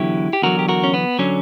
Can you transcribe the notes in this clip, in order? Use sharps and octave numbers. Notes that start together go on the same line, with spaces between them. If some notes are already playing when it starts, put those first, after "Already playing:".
Already playing: E2 D3 F#3 E4 G4
G4
E2 D3 F#3 F#4 A#4
G4
F#4 A#4
C#4
B3
D3 F#3 C#4